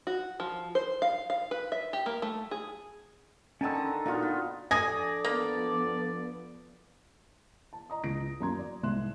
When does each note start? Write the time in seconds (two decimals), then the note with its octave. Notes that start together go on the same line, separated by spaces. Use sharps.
0.07 F#4
0.40 F3
0.75 C5
1.02 F5
1.30 F5
1.51 B4
1.72 E5
1.93 G4
2.06 A#3
2.22 A3
2.51 G#4
3.61 D3 D#3 C#4 G#5 A5 E6
3.75 A#5
4.06 A#2 B3 D#4 F4 F#4
4.22 B3
4.71 F3 D4 A4 D5 G#5 D#6 A#6
5.24 F3 A#3 B3
7.73 A5
7.90 D#5 A#5 D#6
8.04 C#2 A#6 D7
8.40 F#2 A#3 A#5 C6 G#6
8.59 D5
8.83 C2 G#2 E5 C6 F#6 E7